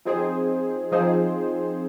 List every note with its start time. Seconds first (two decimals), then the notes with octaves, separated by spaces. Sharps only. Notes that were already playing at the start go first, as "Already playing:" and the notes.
0.05 F3 C4 D#4 G#4 C5
0.92 F3 C4 D#4 G#4 C5